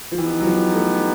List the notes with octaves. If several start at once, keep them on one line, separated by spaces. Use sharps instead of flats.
F3
E3 B3 D#4 G4
F#3
F3
A3